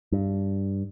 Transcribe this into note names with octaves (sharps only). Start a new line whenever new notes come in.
G2